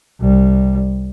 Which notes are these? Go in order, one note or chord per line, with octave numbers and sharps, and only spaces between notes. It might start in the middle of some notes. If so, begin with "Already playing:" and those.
C2 G3